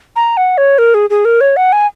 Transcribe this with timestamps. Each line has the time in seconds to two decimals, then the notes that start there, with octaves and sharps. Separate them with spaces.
0.16 A#5
0.37 F#5
0.58 C#5
0.78 A#4
0.94 G#4
1.10 G#4
1.25 A#4
1.41 C#5
1.57 F#5
1.72 G#5